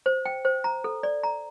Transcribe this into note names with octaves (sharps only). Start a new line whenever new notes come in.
C5
G5
C5
A#5
A4
D5
A#5